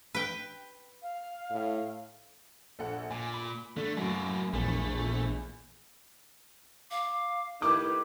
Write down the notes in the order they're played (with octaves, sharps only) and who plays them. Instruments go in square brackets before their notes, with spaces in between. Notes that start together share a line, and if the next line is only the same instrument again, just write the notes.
[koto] B4 G5
[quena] F5
[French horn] A2
[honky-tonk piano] A#1 A4 F#5
[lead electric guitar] A#2 [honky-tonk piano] G#5
[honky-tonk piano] B5
[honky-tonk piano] D3 [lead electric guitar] A3
[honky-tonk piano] F#2 A2 [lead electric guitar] A#3 F#4
[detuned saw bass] A#1 [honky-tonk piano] E2 [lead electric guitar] A3
[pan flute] F5 [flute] D6
[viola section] D#3 A3 B4 [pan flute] E4 [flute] G4 [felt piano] D6